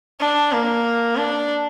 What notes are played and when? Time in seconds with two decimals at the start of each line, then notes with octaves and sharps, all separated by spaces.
0.20 D4
0.52 A#3
1.17 D4